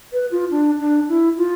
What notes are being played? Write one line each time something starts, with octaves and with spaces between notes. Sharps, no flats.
B4
F4
D4
D4
E4
F4